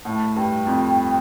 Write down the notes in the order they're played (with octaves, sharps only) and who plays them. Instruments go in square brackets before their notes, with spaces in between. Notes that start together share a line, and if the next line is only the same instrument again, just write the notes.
[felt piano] A2 [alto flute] A5
[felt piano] G2 [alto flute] G5
[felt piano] F2